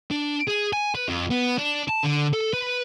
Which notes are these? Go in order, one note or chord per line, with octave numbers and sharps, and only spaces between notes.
D4
G#4
G#5
B4
F2
B3
D4
A5
D3
A4
B4